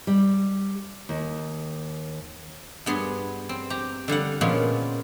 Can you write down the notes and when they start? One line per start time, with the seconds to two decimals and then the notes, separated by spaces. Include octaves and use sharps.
0.07 G3
1.09 D#2
2.86 G2 B3 G#4 C6
3.49 C4
3.70 G4 A#5
4.08 D3 G3 F5 F#5
4.41 A#2 F3 G#3 B3 C#4 F4